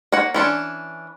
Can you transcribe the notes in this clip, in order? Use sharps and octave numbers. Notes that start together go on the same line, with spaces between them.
A#3 C#5 F#5
E3 C#4 D4